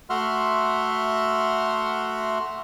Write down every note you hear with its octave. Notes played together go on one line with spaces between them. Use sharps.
A3 F#4 E5 F#5 C6 F6